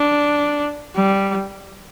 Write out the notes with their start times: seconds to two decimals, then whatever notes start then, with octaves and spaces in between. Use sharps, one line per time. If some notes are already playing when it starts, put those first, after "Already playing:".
Already playing: D4
0.95 G3